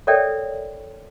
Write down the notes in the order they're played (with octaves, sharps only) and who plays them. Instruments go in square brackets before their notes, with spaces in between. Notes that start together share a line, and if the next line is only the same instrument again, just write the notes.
[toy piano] A4 A#4 C#5 D5 E5 G5